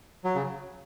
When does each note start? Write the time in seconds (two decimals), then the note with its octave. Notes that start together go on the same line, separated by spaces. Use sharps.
0.24 F#3
0.35 C#3